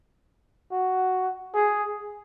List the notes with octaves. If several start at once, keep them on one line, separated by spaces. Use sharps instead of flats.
F#4
G#4